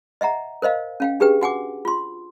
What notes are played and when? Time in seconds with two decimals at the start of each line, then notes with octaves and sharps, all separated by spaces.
0.21 D#5 E5 F#5 A#5
0.62 A#4 C5 D#5 F5
1.00 C#4 F5 G5
1.20 D4 G4 G#4 B4 G5
1.41 F#4 F#5 G#5 D6
1.85 F4 C6